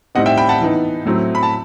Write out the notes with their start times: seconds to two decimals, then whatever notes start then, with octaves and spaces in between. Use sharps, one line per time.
0.15 A2 G3 C4 D#4 D#5 F#5
0.26 E5 G5
0.37 G5 B5
0.49 F#5 A5
0.61 E3 B3 D#4
1.05 A2 F#3 A3 C4 E4
1.35 B5
1.43 A5